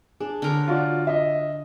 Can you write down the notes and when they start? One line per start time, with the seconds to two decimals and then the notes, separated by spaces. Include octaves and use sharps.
0.20 D4 G#4
0.42 D3 A#4 C#5
0.68 F4 F#4 D5
1.07 D#5 E5